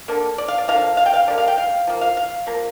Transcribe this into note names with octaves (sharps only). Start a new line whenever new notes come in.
D3 A#3
D5
F5
D5
D3 F3 A#3 F5
F5
G5
F5
D3 G3 A#3 D5
F5
G5
F5
F3 A#3
F5
F5
F3 A#3